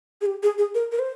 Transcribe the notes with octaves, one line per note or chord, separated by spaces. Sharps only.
G#4
G4
G#4
G#4
A#4
A#4
C5